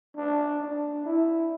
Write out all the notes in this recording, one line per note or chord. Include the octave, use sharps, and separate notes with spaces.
D4
D4
E4